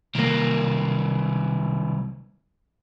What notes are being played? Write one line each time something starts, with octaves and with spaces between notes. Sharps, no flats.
C2 D#3 F#3 A#3